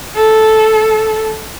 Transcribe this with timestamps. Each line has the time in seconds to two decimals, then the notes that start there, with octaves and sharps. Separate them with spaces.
0.16 A4